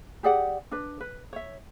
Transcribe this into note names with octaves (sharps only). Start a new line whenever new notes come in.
G4 G#4 D5 F#5
D4 B4
B4
C#5 E5